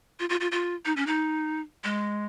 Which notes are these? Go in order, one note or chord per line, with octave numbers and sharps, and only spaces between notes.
F4
F4
F4
F4
D#4
C#4
D#4
G#3